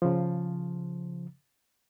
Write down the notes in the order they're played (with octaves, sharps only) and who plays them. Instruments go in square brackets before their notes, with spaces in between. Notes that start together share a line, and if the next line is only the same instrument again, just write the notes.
[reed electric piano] C#3 F3